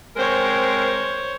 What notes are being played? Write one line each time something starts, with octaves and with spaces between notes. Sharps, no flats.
G#3 C4 A#4 C5 C#5